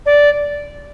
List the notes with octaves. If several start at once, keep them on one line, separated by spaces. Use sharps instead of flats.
D5